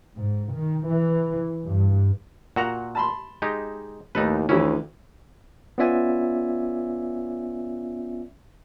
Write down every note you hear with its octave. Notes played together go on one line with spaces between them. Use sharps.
G#2
D#3
E3
G2
A#2 F#4 F#5 A#5
A5 B5 C6
G#3 D#4 G4
D#2 A2 D#4 A4 B4
D2 D#3 E3 C#4 E4
B3 C#4 F4 D5 E5 G#5